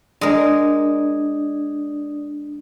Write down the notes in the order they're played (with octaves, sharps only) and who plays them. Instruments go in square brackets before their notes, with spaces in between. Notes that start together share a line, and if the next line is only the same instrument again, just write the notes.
[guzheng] G#3 A#4 [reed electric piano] D4 [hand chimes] D5 D#6